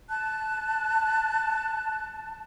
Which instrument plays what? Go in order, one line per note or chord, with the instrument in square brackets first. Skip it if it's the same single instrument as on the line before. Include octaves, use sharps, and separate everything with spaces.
[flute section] A5 [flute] F#6